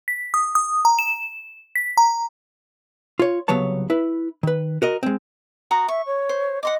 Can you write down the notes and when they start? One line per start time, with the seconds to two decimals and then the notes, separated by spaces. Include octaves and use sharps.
0.08 B6
0.34 D#6
0.55 D#6
0.85 A#5
0.99 E7
1.75 B6
1.97 A#5
3.19 F4 C#5
3.48 C2 C#3 F#3 B3 C#5 A5
3.90 E4 B4
4.43 D#3 B4
4.82 F#4 A#4 D#5
5.03 G#3 C4
5.71 F#4 A#5 D#6
5.88 E5 C#6
6.06 C#5
6.29 C5
6.63 D#5 F#5 C6 D6